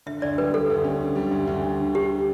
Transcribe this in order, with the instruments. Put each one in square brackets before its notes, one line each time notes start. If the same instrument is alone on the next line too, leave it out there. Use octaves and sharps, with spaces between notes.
[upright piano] D3 [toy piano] E5
[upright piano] D2 [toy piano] D5
[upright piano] G3 [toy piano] B4
[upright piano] D3 [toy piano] A4
[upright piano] D2
C#4
D3
G3
D2
D2
D3
D3
[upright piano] D3 [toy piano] G4